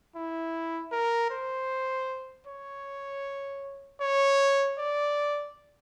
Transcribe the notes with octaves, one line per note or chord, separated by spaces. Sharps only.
E4
A#4
C5
C#5
C#5
D5